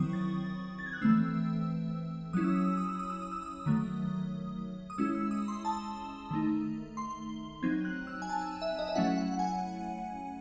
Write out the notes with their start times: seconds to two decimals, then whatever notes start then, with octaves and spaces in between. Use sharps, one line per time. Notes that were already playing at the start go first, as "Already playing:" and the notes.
Already playing: D#3 F#3 C4 E4 C#6 D#6
0.13 A6
0.79 A6
0.86 G#6
0.93 F#6
1.01 E3 A3 C4 E6
2.33 F#3 C#4 E4 D#6
2.44 E6
2.56 D#6
2.66 E6
2.77 D#6
2.89 E6
2.99 D#6
3.10 E6
3.22 D#6
3.32 E6
3.42 D#6
3.66 D#3 F#3 A3 D#6
4.90 D#6
4.98 G#3 C#4 E4 E6
5.15 E6
5.31 D#6
5.48 C6
5.65 A5
6.31 D#3 A3 D#4
6.97 C6
7.63 F#3 C4 D#4 G#6
7.85 F#6
8.07 E6
8.22 G#5
8.30 A5
8.62 E5
8.79 D#5
8.88 E5
8.95 F#3 A3 C#4 E4 F#5
9.18 F#5
9.34 F#5
9.39 G#5